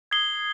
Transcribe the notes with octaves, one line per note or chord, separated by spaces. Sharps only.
D#6 G#6 C7 G7